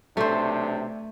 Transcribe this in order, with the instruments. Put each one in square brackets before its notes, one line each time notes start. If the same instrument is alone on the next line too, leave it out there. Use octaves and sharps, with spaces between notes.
[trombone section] B1 C3 D4 [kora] A3 C5